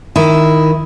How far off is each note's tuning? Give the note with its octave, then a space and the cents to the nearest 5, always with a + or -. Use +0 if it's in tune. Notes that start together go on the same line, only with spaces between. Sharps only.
D#3 +0 E4 +0